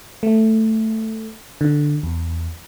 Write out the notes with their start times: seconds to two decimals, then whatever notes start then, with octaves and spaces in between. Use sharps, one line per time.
0.23 A3
1.61 D3
2.03 E2